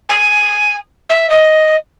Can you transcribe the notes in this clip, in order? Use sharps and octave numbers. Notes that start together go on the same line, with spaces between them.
G#5
E5
D#5